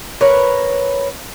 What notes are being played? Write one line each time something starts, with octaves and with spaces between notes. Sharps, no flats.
A#4 B4 C#5